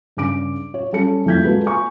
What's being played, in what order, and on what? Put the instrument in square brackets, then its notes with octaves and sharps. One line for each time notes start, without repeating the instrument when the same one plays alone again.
[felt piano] G2 C#3 D6 D7
C#5
G3 C#4 A4 C#7
F2 E3 A3 G6 G#6 B6
G#3 A#3 F#4 A4 B4
G#5 C#6